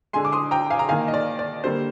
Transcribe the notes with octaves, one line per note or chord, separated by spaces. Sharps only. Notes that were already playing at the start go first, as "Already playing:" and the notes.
D3 G#3 G#5 C6
D6
C6 D#6
G5 A#5
F5 G#5
A#5
D#3 A#3 F5 G#5
D#5
D5
D5
D3 G3 A#3 C5